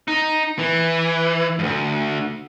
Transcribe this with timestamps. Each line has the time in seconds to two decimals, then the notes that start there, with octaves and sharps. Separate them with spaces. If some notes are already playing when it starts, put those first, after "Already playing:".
0.08 D#4
0.59 E3
1.59 D2 G2